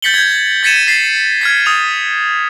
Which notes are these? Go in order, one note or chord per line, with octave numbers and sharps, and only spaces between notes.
G6 A6 B6 C#7 F#7 G7
G6 G#6
G#6 A6 B6 C#7 D#7 E7
A6 B6 C7
F6 G#6 B6
D#6 F7